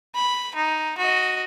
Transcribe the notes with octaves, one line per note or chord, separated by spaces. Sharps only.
B5
D#4
F#4 D#5